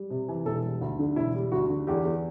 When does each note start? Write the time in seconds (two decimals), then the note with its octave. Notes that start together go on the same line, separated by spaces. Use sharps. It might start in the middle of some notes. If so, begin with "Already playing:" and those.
Already playing: G3
0.10 C3
0.28 E3
0.46 E1 A4
0.64 G3
0.81 D2
0.99 D3
1.16 E1 E4
1.34 G3
1.52 D2 F#4
1.70 D3
1.87 E2 G4
2.05 E2